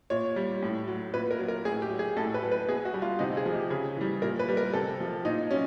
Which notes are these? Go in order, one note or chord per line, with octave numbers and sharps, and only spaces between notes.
A#2 C#5
G3
A2
F#3
A#2 B4
A#4
F#3
A#4
A2 G#4
G4
F#3
G#4
A2 A4
B4
F#3
B4
B2 G#4
F#4
G3
F4
C3 D#4
G#4
F3
G4
C#3 G#4
E3 G3
A#2 A#4
B4
G3
A#4
C3 A4
F3
A#2 D#4
F#3 C#4